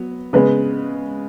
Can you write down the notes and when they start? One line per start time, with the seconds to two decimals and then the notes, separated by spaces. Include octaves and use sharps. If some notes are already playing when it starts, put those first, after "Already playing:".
Already playing: F#3 B3
0.33 C#3 G#3 B3 B4